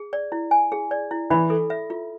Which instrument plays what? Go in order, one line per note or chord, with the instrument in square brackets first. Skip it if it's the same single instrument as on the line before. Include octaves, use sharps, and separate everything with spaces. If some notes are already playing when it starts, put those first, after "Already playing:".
Already playing: [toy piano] G#4
D5
E4
G#5
G#4
D5
E4
[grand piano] E3 [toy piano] B5
[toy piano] A4
E5
F4